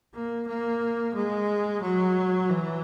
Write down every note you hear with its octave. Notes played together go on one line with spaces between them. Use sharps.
A#3
A#3
G#3
F#3
E3